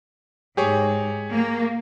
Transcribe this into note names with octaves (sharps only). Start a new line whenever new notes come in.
G#2 G4 G#4 C#5
A#3